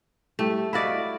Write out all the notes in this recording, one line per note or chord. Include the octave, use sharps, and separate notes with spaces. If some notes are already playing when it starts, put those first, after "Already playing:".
G3 A3 E4 G4
E4 F#4 D5 D#5 F5 B5